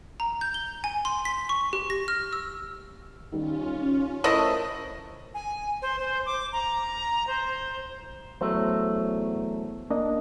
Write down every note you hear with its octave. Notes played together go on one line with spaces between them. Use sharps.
A#5
G6
G7
G#5
C6
B6
C#6
G4
A#6
F6
E6
D#3 G3 C#4 F4
A3 E4 A#4 C5 C#5 D#5 D#6 E6
G#5
C5
C5
D6
A#5
C5
E2 F#3 A3 C5
A#3 D4 D#5